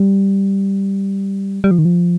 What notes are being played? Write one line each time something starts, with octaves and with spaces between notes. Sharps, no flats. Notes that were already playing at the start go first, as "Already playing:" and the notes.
Already playing: G3
G3
F3
D#3
F3